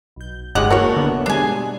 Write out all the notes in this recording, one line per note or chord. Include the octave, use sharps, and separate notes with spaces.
B1 G6
G1 G#3 G4 C#5 D#5 F#5
E2 A3 A#3 F#4 A#4 C#5
D3 B3
B2 G3 G#3 D4 G#5